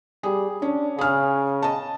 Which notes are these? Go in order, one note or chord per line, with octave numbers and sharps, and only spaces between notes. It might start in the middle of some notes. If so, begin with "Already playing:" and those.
G3 G#4
C#4 D4
C#3 G#4 F6
D#5 A5